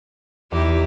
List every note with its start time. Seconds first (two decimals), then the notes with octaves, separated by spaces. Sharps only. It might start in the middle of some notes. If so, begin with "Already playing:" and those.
0.52 E2 D#4 E4 G4